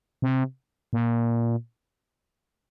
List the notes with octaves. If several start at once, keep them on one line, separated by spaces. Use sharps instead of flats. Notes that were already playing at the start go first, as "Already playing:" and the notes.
C3
A#2